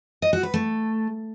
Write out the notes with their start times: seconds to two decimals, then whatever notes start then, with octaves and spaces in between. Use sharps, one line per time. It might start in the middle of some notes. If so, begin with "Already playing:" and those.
0.22 D#5
0.33 F#4
0.43 B4
0.54 A3